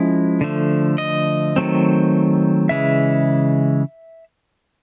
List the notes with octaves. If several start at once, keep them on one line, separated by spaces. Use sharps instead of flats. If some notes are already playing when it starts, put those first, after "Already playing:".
Already playing: F3 G#3 C#4 E4
D3 F3 A3
D#5
D#3 F#3 A3 C4
C#3 E3 G#3 E5